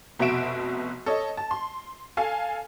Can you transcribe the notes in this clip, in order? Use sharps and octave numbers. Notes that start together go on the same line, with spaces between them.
F1 B2 F#4 E5 D7 E7
A4 C#5 D#5
A5
C6
A4 F5 G#5